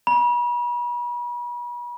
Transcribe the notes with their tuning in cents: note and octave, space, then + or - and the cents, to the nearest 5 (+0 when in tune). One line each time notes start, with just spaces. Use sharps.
B5 -40